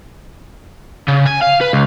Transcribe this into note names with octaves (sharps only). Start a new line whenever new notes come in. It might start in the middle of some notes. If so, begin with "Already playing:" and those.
C#3
G#5
F5
B4
C#2